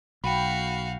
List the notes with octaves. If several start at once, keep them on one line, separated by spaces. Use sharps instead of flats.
B1 F#4 F5 G5 B5